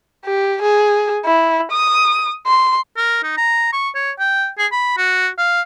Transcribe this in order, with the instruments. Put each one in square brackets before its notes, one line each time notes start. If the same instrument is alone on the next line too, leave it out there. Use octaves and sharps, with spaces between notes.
[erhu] G4
G#4
E4
D#6
C6
[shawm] A#4
D#4
A#5
C#6
C#5
G5
G#4
B5
F#4
F5